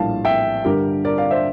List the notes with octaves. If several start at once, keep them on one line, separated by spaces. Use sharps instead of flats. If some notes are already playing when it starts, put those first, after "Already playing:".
Already playing: A#1 A2 G3 F5 A5
E5 G5
G2 D3 G3 D4 G4 A#4
A#4 D5
D5 F5
C5 E5